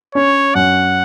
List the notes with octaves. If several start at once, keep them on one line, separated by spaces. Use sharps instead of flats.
C#4 C#5
F#2 F#5